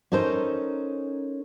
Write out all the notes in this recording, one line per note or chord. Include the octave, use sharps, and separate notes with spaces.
C#4 D#4 A4 A#4 C5